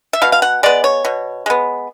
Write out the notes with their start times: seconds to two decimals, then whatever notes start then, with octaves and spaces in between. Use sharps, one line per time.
0.13 E5
0.22 B2 F5
0.32 F5
0.42 F#5
0.63 G#3 B3 D5
0.84 C#5
1.05 B2
1.46 G#3 B3